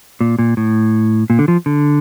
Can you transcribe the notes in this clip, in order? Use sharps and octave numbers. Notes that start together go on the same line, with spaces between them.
A#2
A#2
A2
A#2
D3
F3
D3